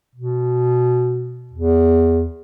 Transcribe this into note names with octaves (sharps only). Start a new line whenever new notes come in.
B2
E2